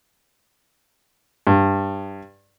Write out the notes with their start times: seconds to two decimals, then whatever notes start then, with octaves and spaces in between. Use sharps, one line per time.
1.47 G2